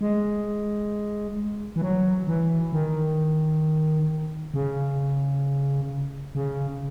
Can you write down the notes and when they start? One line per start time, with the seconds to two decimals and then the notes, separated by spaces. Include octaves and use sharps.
0.01 G#3
1.76 E3
1.82 F#3
2.27 E3
2.72 D#3
4.54 C#3
6.35 C#3